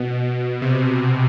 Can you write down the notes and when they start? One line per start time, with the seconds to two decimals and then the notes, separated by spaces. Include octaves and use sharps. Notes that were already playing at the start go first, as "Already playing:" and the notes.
Already playing: B2
0.62 C3